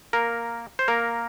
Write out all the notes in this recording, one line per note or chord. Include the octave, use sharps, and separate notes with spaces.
A#3 A#4
C5
A#3 A#4